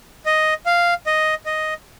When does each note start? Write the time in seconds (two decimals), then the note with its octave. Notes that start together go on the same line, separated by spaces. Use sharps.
0.26 D#5
0.66 F5
1.07 D#5
1.46 D#5